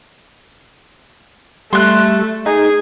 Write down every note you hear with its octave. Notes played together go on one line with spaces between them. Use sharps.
G3 A3 C6 F#6
D#4 G#4